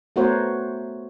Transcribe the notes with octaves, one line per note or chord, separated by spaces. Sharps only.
A3 B3 F#4 A#4 C5 C#5